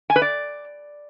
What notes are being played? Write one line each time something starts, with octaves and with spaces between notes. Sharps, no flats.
G#5
B4
D5